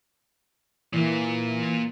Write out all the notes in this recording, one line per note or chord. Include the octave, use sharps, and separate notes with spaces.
A#2 E3 A#3